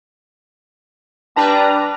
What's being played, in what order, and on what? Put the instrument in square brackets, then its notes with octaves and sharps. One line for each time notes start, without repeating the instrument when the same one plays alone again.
[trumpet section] G3 [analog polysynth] D4 B4 A#5 [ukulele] A5